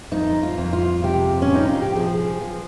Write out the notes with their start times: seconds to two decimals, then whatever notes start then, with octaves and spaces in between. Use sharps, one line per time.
0.12 F2 D#4
0.43 F4
0.58 F2
0.73 F4
1.04 C3 G4
1.42 C#4
1.50 C3 D#4
1.69 F4
1.82 G4
1.95 F3 G#4
2.42 F3